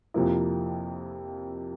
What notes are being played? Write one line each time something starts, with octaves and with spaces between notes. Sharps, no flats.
F2 C3 F3 A#3 E4